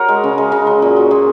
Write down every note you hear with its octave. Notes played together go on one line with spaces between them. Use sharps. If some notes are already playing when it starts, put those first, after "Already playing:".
Already playing: F#4 A#4 C#5
G#3
C#3
G#3
C#3
F#3
A#2
F#3
A#2 G#4